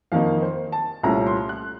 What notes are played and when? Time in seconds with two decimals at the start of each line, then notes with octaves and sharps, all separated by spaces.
0.12 F2 D#3 A#3 D#4 F5
0.42 C5
0.72 A5
1.03 C2 A#2 A3 C#4 A#5
1.27 C6
1.49 F#6